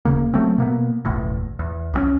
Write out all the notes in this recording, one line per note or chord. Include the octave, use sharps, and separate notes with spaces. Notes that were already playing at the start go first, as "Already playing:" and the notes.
D1 F2 C#3 A#3
F#3 A3 C4
B2 A#3 B3
F#1 B1 E2 A2
E2
C2 F3 C#4